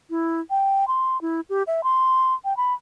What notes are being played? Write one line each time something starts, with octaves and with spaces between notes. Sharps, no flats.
E4
G5
C6
E4
G4
E5
C6
G5
B5